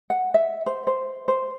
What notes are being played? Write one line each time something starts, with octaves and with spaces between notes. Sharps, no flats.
F#5
E5
C5
C5
C5